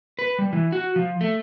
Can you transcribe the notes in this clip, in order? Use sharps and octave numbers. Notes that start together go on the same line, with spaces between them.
B4
G3
E3
F#4
F3
A3